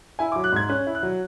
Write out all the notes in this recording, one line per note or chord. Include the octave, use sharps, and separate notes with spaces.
E4 G#5
D6
F#3
F#6
G#2 G#6
C#4 F#6
E4
F#6
F#3